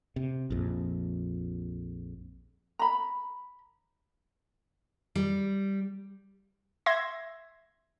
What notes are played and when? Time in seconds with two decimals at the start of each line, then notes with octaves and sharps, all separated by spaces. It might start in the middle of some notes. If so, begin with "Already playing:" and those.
0.16 C3
0.50 A#1 F2
2.79 A#5 B5
5.16 G3
6.86 E5 C6 G#6 A#6